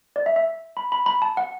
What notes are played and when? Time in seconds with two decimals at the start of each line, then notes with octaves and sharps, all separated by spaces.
0.16 D5
0.26 E5
0.36 E5
0.77 B5
0.92 B5
1.06 B5
1.22 A5
1.37 F#5